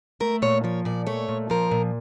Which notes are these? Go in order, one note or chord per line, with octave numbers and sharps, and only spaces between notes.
A3 A#4
A#2 C#5
F3 C#5
A#2 D5
A3 C#5
A#2
F3 A#4
A#2